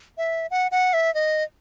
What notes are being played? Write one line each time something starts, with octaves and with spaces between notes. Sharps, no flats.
E5
F#5
F#5
E5
D#5